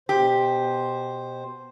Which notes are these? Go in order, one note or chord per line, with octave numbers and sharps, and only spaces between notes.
B2 G4 C5